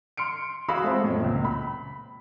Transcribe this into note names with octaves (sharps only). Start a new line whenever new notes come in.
C6 F6 C#7 D7
F#4 G#4 F5 B5 E6
G#3 A3 C4 F4 A4 C5
F2 A2 F#3
C#2 A#2
B5